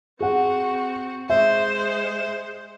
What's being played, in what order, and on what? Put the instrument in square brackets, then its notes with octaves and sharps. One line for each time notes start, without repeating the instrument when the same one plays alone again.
[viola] C4 F#4 [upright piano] G#4 F#5
[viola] G#3 C5 [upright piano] E5